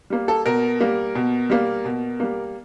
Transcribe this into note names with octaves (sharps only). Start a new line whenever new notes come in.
G3 A#3
A4
B2 A#4
G3 A#3
B2
G3 A#3
B2
G3 A#3